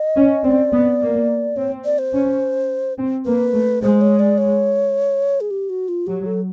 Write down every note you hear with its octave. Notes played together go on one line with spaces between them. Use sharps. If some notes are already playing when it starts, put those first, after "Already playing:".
Already playing: D#5
C#4
C4 D5
B3
A#3
C4 C#5
D5
C5
C#4
C4
A#3 B4
A3
G#3 C5
C#5
D5
C#5
G#4
G4
F#4
F4
F#3 G4
A4